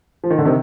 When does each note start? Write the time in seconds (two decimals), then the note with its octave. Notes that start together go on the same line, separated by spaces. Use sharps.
0.24 F3
0.30 D#3
0.38 D3
0.45 C3 D#3